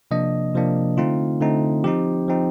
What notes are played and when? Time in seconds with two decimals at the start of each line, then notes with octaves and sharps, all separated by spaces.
0.11 C3 F3 A#3 D4 D#5
0.54 C3 F3 A#3 D4
0.97 D3 A3 C4 D#4 F4
1.41 D3 A3 C4 D#4
1.84 F3 C4 D#4 G4
2.28 F3 C4 D#4